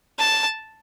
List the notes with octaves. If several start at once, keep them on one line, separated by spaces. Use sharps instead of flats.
A5